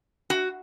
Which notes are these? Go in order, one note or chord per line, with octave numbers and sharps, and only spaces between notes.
F#4